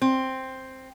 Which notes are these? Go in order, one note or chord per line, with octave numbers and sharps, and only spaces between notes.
C4